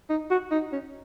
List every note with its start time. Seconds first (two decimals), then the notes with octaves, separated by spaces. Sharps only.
0.10 D#4
0.31 F#4
0.51 D#4
0.72 C#4